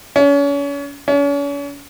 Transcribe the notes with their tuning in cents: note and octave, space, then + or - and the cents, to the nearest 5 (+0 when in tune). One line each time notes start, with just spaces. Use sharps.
C#4 +35
C#4 +40